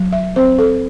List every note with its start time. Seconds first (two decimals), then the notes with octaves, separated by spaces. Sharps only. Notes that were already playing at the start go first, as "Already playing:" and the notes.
Already playing: F#3
0.12 E5
0.36 C4 C5
0.59 A4